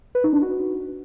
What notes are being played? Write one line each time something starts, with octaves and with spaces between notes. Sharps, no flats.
B4
D#4
D4
F#4